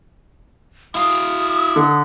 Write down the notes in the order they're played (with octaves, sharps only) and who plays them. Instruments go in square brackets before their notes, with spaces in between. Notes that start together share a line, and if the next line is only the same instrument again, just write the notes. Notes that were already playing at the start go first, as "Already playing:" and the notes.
[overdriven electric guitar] E4 F5 [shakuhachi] D#6
[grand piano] D3